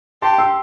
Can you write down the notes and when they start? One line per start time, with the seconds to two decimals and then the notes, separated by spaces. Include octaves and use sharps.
0.22 G4 A5 C6
0.38 C6 E6